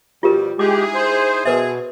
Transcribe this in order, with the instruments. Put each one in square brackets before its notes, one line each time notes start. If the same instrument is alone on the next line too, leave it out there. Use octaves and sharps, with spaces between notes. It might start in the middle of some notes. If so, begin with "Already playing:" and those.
[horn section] B2 F3 G3 [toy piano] F4 G4 A#4
[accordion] G#3 G4 [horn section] D#4 E4 G#4 [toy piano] D6
[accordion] C5
[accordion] B2 [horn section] G#4 [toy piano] A#4 B4 E5